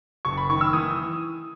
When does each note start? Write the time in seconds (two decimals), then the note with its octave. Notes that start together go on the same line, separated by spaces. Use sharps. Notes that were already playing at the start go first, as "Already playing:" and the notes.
0.25 F#1 C#6
0.37 B5
0.50 D#3 C#6
0.61 E6
0.73 E3 D#6